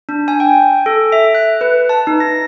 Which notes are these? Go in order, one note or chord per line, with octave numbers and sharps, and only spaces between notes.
D4
G#5
G5
A4
E5
F#6
B4
A5
D#4
A#6